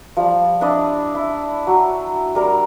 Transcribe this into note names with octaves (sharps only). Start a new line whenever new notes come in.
F3 G3
D4 E4 D5 D#5
E4
F#3
G3 A#4